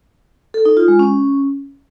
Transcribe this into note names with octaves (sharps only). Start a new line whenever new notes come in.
A4
D#4
F4
G#3
C#4